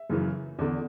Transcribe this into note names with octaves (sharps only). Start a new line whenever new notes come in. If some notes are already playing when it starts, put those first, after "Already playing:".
Already playing: E5
F#2 C#3 E3
E2 D3